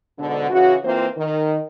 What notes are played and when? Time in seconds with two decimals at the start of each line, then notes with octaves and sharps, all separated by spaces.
0.18 G#2 B2 D3
0.50 C#3 E3 F#4
0.84 E3 A#3 C4 F4 C5
1.17 D#3